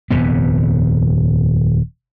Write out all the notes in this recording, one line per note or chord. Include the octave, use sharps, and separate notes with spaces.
D#1 F2 C3 B3